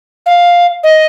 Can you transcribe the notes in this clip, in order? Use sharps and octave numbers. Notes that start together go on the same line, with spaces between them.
F5
D#5